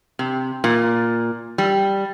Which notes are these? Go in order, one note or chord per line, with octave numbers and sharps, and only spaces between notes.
C3
A#2
G3